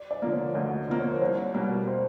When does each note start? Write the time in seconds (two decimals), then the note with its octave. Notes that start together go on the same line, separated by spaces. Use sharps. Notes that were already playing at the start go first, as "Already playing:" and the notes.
Already playing: D5
0.11 D5
0.22 D3 F3 A#3
0.32 C#5
0.54 D2 D#5
0.88 D3 F3 A#3
0.99 C#5
1.11 C5
1.21 C2 C#5
1.54 B2 G3 A#3
1.87 C5